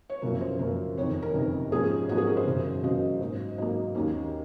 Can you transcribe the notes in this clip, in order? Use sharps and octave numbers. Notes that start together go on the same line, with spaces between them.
C#5
F#1 F#2 C#3 F3 A#3 A#4
C5
F#1 F#2 C#3 F3 A#3 A#4
F#1 F2 C3 D#3 C#5
A#4
F#1 F2 C3 D#3
G#2 F3 A#3 C#4 G#4
G#2 F3 A#3 C#4 F#4
G#4
A#4
C5
F#1 F#2 C#3 F#3
F#1 F#2 C#3 F#3 D#5
G#2 F#3 A#3
G#2 F#3 A#3 D#5
D#2 D#3 A#3 C#4